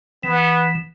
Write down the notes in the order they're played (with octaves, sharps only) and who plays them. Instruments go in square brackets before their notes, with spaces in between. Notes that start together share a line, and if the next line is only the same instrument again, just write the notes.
[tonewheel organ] E3 [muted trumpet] B3